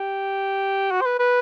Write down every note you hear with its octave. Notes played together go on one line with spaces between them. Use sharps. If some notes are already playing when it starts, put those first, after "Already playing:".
Already playing: G4
F#4
C5
B4
B4